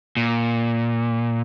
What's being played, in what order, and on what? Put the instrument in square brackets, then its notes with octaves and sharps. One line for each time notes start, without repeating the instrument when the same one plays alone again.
[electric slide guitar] A#2